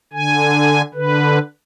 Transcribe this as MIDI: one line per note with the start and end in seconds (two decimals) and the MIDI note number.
0.13 0.82 50
0.13 0.82 80
0.94 1.39 50
0.94 1.39 71